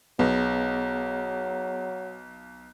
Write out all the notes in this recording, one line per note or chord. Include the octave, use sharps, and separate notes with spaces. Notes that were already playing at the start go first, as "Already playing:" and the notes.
B1 F#3 B3 G#4